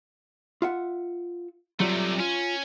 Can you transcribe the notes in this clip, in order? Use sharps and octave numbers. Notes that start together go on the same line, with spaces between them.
F4 E5 F#5
C3 F#3 G3 A3 F4
C#4 F4